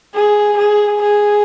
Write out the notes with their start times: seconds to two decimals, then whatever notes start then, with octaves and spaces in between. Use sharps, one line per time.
0.14 G#4
0.58 G#4
1.02 G#4